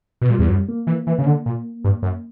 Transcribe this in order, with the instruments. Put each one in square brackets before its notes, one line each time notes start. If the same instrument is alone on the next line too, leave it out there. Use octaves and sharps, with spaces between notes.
[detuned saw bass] B2
[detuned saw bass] A#2 [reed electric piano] G3
[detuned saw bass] E2
F#2
[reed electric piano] A#3
[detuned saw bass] E3
E3
C#3
D3
A#2
G2
F#2